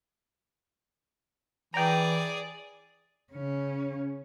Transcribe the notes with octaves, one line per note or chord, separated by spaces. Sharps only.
E3 G#4 D5 G5 A#5
C#3 C#4